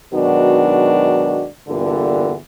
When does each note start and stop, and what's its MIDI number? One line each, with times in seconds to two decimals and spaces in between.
0.13 1.44 44
0.13 1.44 47
0.13 1.44 51
0.13 1.44 54
0.13 1.44 62
0.13 1.44 66
1.68 2.34 40
1.68 2.34 43
1.68 2.34 46
1.68 2.34 50